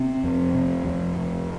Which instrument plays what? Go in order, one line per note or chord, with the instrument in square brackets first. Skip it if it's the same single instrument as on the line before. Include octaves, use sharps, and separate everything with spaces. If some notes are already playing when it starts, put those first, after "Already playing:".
Already playing: [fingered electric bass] C3 C4
F2
C3
F2
C3